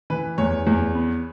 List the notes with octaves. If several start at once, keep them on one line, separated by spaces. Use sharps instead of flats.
E3 B4
E2 C#5
E2
B3